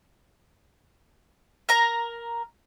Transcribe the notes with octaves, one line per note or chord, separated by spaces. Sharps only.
A#4 A#5